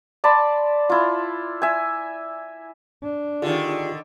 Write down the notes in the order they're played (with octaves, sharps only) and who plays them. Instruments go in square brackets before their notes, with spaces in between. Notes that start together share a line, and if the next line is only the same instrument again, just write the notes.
[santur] D5 A5 B5 C6
E4 F4
E5 G#5
[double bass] D4
[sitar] D3 D#3 [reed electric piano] F4 G4 G#4